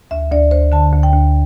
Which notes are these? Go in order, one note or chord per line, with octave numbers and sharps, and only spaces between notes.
D2 E5
D2 D5
D2 C5
D3 A5
D2
G5
D2